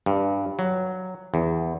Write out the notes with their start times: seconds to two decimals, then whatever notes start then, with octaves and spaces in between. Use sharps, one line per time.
0.06 G2
0.59 F#3
1.34 E2